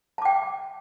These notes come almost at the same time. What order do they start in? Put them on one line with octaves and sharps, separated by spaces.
A5 D6 G5